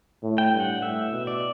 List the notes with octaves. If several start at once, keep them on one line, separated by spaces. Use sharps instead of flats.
A2
G5
G2
F#5
A2 E5
B2
D5